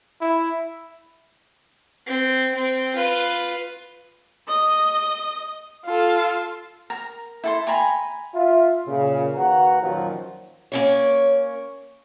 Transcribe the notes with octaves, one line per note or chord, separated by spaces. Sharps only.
E4
C4
C4
F4 B4
D#5
F4 A4
A#4 A#5
E4 A4 C6
G5 G#5 A#5 B5
F4 E5
A#2 C#3
D#3 A#3 F#4 B4 F#5 A#5
F#2 A#2 D#3 F3 F#3
A#3 C#4 C#5